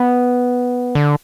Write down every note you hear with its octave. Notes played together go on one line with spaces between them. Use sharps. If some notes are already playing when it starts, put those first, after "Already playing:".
Already playing: B3
D3